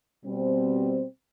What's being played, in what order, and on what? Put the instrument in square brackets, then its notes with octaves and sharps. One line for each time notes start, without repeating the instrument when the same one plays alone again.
[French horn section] B2 G3 C4